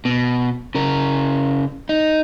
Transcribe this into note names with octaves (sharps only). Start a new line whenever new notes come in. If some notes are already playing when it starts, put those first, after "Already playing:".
B2
C#3 A#4
D#4